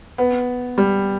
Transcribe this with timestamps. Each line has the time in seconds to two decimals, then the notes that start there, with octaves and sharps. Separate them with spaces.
0.18 B3
0.78 G3